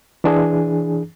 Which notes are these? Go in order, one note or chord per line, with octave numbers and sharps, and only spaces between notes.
E3 D4 G#4